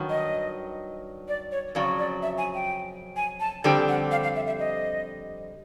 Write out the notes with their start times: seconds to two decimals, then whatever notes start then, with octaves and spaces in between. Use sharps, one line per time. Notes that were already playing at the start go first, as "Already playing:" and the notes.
Already playing: G2 D#3 F#3
0.09 D#5
1.28 D5
1.52 C#5
1.75 F2 C#3 F#3 D5
1.99 D5
2.22 E5
2.38 G#5
2.54 G5
3.16 G#5
3.40 A5
3.64 F2 D3 G3 C4 G5
3.88 F#5
4.11 F5
4.24 F5
4.36 E5
4.47 E5
4.59 D#5